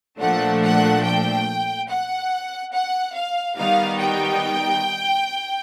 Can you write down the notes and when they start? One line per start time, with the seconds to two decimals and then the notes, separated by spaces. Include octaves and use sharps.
0.20 A#2 F3 A3 D4 F#5
0.62 F#5
1.04 G5
1.88 F#5
2.73 F#5
3.15 F5
3.56 D#3 G3 B3 D#4 F5
3.99 G5